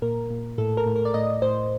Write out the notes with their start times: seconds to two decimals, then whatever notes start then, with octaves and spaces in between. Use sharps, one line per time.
0.02 A#2 A#4
0.30 A#2
0.58 A2 A4
0.77 A#4
0.86 A2
0.96 A#4
1.05 D5
1.14 A2 D#5
1.42 A2 C5